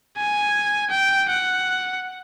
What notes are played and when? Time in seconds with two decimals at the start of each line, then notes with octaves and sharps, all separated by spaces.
0.18 G#5
0.91 G5
1.29 F#5